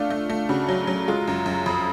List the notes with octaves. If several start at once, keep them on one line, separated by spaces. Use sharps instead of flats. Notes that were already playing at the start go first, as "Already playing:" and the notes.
Already playing: A3 D4 F4
A3
A3
C#3 F#4
F#3
F#3
G#3 F4
F#2
F#2
F2